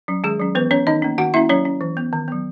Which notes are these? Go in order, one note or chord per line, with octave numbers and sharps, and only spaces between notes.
F#3 C#4
D#3 G#3 G#4
F#3 C#4
E3 B3 B4
B3 C#4 C#5
D#3 D#4 D#5
A#3 C#4
D#3 F#4 F#5
A#3 C#4 E4 E5
F#3 C#4 C#5
C#4
E3
B3
D#3
F#3 B3